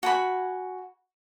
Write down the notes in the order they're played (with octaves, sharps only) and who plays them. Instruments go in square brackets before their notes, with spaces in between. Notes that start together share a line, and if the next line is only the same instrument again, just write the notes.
[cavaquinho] F#4 G#5 B5